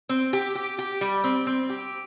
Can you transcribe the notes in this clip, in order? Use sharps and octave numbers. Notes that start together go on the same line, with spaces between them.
C4
G4
G4
G4
G3
C4
C4
G4